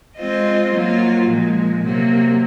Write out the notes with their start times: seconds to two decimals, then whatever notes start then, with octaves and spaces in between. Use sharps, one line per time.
0.18 G#3 C4 F4 C5 D#5
0.73 F#3 A#3 F4
1.28 A#2 F3 G#3
1.83 C3 F#3 A#3